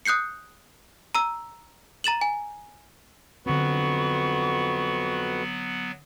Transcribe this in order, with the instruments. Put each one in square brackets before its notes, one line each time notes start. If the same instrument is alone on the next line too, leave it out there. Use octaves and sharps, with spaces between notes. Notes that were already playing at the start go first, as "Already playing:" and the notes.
[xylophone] D#6 F#6 G6 C7 C#7
A#5 E6
A#5 A6 E7 F#7
G#5
[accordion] F2 F#4 B4 [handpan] D3 C4 [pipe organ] F#3 B3 [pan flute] C#6